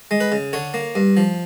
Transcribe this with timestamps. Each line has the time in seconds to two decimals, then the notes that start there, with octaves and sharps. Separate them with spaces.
0.11 G#3
0.20 B4
0.32 C#3
0.53 D3 C#5
0.74 A#3
0.95 G2
1.17 F3